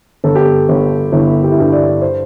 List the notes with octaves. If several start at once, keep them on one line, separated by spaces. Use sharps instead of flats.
G1 A4
G4
A4
G1
G1 E4
G4
E4
G2 G4
D5
C5